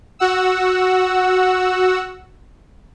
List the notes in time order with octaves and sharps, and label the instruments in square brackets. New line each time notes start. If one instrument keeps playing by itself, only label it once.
[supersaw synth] F#4 F#5 E6